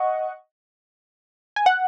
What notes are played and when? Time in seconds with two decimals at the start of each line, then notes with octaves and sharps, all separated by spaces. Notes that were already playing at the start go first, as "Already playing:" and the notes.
Already playing: D#5 F#5 C#6
1.56 G#5
1.66 F#5